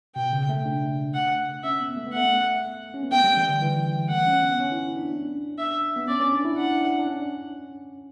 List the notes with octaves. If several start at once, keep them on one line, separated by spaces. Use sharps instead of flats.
B2 G5
C#3
A3
D4
F#5
C#4 E5
B3
A3
B3
A3 F#5
C#4
B3
A3 G5
G3
E3
D3
E3
A3 F#5
C#4
B3
C#4
E4
D4
E5
B3
C#4 D5
C#4
D4
E4
D4 F#5
D4
C#4